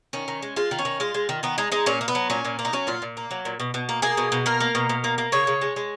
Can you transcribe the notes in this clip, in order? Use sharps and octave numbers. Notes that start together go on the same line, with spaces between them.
D#3 C#4
D#3
G#3
G#3 F4
D#3
C#4
D#3
G#3 F4
G#3
D#3
D#3 B3
G#3 D#4
G#3 D#4
A#2 C#4
A#3
B3
F#3
A#2 C#4
A#2
A#3
D#4
F#3 C#4
A#2 F4
A#2
A#3
F#3
A#2
B2
B2
A#3
A#3 G#4
B2
B2
A#3 A#4
A#3
B2
B2
A#3
A#3
C#3 C#5
C#3
G#3
G#3